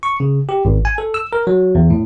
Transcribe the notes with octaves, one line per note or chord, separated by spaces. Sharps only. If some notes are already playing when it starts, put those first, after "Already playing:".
C#6
C#3
G4
G#1
G#5
A4
E6
A#4
F#3
E2
A2